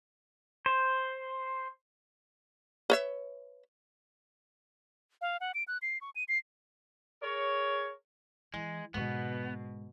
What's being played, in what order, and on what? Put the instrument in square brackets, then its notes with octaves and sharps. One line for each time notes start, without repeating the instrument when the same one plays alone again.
[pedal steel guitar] C5
[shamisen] B4 C#5 E5
[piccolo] F5
F#5
D7
F#6
C7
C#6
D#7
C7
[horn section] G#4 A#4 C#5
[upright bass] E3 [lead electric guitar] G#3
[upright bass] G#2 D3 [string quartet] B2 [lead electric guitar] B3